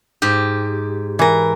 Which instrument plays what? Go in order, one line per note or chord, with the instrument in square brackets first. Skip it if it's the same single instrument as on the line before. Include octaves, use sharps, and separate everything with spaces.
[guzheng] G#2 G4
[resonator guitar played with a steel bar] E3 A#4